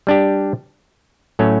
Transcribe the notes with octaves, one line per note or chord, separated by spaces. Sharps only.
G3 D4 G4
A2 F#3 A3 C#4